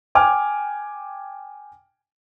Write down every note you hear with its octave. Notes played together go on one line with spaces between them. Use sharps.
G5 G#5 D6 F6